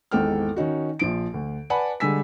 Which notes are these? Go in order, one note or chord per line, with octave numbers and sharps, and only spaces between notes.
G#1 E2 G#2 A4 G5 F6
D#3 C#4 D#4 F#4
A#1 F3 D7
D2
B4 D5 F#5 G#5 A5 B5
D3 G3 G#3 G#5 E6 B6